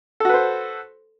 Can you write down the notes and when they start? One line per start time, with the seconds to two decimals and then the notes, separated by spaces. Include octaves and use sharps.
0.20 A4
0.25 F#4
0.29 B4
0.34 C5